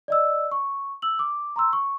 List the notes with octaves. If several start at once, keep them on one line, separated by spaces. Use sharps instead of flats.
D5 D#5 E6
C#6
E6 F#7
D6
A#5 C6 E6
C#6